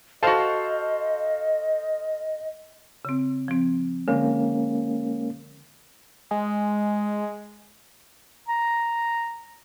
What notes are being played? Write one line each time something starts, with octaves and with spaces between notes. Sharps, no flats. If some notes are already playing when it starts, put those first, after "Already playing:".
F#4 A4 C5 D#5 F5 A5
C#3 C4
F3 C4
D3 G#3 A#3 C#4
G#3
A#5